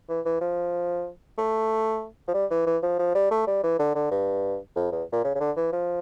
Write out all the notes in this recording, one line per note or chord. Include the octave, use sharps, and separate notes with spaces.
E3
E3
F3
A3
F3
G3
E3
E3
F3
F3
G3
A3
G3
E3
D3
D3
G2
F2
E2
A#2
C#3
C#3
D3
E3
F3